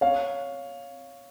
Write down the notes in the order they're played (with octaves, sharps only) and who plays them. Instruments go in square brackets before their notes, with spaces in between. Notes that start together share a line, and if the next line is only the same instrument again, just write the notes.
[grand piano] C#5 F5